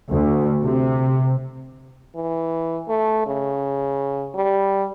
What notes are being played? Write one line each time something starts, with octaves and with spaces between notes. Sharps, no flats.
D2
C3
E3
A3
C#3
G3